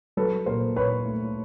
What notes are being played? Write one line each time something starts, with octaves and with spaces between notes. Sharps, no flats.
F#3 A4 B4
A#2 A#4 C5
A#2 B4 C#5
A3